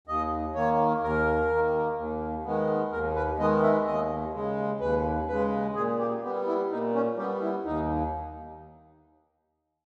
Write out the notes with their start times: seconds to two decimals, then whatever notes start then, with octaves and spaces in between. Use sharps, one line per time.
0.07 D#2 D#5
0.55 D#3 A#3 C#5
1.02 D#2 A#4
1.50 D#3
1.55 A#3
1.97 D#2
2.45 D#3 G#3 B3
2.92 D#2 A#4
3.16 B4
3.39 D#3 G#3 B3 D#5
3.63 E5
3.87 D#2 D#5
4.34 C#3 G#3
4.81 D#2 B4
5.28 C#3 G#3 B4
5.75 A#2 G#4
5.99 G4
6.24 G3 B3 G4
6.47 E4
6.70 A#2 D#4
6.95 C#4
7.17 G3 G4
7.21 B3
7.42 E4
7.65 D#2 D#4